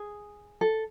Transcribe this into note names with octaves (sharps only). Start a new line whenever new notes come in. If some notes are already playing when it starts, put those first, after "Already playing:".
Already playing: G#4
A4